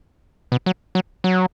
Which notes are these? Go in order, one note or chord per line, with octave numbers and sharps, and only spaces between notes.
B2
F#3
F#3
F#3